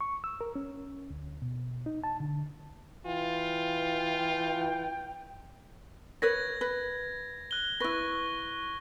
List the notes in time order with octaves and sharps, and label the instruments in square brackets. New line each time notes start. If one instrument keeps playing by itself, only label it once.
[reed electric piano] C#6
E6
A#4
C#4
D2
B2
D#4
A5
D3
[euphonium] E3 [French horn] F4 [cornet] G5
[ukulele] A#4 B4 C#5 [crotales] G#6 A#6
[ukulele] B4
[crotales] F#6 G7
[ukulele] E4 B4 [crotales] C#6 A#6